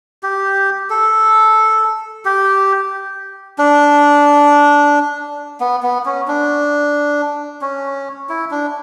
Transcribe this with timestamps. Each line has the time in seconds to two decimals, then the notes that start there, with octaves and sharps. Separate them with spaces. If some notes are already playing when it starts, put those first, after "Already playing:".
0.23 G4
0.90 A4
2.25 G4
3.58 D4
5.60 B3
5.83 B3
6.06 C#4
6.28 D4
7.62 C#4
8.29 E4
8.51 D4